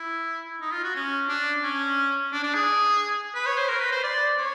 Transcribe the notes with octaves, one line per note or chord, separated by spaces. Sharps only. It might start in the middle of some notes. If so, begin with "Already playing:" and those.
Already playing: E4
D#4
F4
F#4
C#4
D4
C#4
D4
D4
G#4
B4
C#5
C5
A#4
B4
C5
D5
C#5